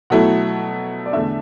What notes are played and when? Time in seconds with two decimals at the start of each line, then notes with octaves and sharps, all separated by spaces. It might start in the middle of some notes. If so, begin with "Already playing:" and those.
0.10 B2 F#3 A3 E4 F#5
1.06 D5
1.12 E2 D3 A3 D4 E5